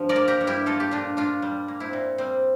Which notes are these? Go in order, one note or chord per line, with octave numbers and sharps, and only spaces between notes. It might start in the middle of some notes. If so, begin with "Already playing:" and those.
Already playing: G2 F3 C5
A#4 D5
A#3
G4 A#4
G2
E4 G4
A#3 F4 A4
G4
A#2 D4 F4
A#2 D4 F4
G3
A#3
C4 E4
A#2
G3 C4